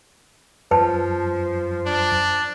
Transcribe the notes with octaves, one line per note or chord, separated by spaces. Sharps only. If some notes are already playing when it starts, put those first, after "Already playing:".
F#2 F3 B4 A5
D4